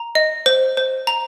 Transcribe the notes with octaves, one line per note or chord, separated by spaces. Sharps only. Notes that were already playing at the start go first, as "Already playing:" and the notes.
Already playing: A#5
D#5
C5
C5
A#5